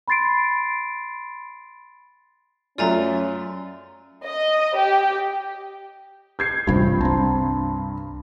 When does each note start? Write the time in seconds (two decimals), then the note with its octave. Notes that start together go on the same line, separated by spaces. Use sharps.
0.08 B5 C6 A6 C7 D7
2.78 F#2 A3 C#4 F4 D5 G#5 A#5
4.25 D#5
4.78 G4
6.39 G6 G#6 C7
6.67 D1 A1 G2 C3 G3 C4 F4
7.01 C2 C4 A5 A#5 C6